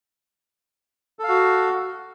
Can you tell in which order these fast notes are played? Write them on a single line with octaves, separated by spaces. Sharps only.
A4 F5 F#4